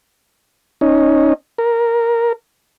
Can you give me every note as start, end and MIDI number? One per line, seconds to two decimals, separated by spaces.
0.81 1.34 61
0.81 1.34 63
1.58 2.33 70